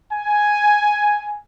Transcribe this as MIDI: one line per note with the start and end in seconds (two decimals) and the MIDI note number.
0.11 1.39 80